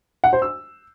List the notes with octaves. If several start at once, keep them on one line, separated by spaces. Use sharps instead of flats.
F#5
C5
E6